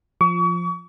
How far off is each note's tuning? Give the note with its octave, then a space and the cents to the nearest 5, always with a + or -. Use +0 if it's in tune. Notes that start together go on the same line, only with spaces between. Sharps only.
F3 +0 C#6 +40